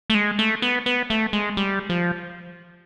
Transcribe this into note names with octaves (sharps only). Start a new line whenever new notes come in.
A3
G#3
A3
B3
B3
A3
G#3
G3
F3